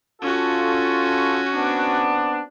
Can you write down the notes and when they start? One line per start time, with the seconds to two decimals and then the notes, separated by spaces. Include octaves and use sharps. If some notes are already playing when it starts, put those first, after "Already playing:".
0.22 C#4 F4 F#4 A4
1.53 B3 C4 D4